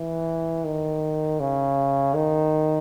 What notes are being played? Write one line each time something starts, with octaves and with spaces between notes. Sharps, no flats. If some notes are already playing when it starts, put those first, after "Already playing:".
Already playing: E3
D#3
C#3
D#3